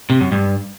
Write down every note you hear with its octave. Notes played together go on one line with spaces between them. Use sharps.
C3
F#2
G2